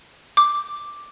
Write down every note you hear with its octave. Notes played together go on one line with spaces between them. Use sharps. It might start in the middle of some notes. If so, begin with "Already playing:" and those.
D6